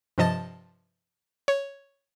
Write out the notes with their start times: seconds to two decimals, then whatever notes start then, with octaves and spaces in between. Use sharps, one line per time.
0.18 G2 C3 F3 D#5 A5 A6
1.48 C#5